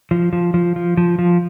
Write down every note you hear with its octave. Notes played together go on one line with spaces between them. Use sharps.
F3
F3
F3
F3
F3
F3